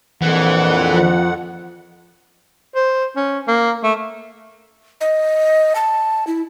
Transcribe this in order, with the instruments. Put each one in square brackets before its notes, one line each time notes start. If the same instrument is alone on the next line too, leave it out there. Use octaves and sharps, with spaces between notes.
[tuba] A#1 [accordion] F2 F#5 [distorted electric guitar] E3
[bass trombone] F3
[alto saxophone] C5
C#4
A#3
A3
[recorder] D#5
A5
E4